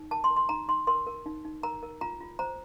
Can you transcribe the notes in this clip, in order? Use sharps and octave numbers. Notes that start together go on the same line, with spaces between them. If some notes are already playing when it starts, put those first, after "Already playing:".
Already playing: D#4
A#4 A5
C6
A#4
C6
D#4 A#5
D#4 C6
A#4 C6
A#4
D#4
D#4
A#4 A#5
A#4
F4 A#5
F4
C5 A#5